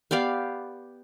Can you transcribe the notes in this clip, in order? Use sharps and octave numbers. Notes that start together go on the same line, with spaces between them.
B3 G4 D5 F5